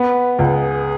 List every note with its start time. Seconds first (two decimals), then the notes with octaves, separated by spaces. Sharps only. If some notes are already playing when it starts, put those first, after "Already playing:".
Already playing: B3 B4
0.39 C#2 G#4